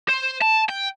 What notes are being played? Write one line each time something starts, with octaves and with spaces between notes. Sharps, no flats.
C5
A5
G5